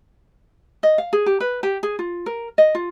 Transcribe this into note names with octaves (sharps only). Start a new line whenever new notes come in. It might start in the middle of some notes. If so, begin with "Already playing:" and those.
D#5
F5
G#4
G4
B4
G4
G#4
F4
A#4
D#5
F4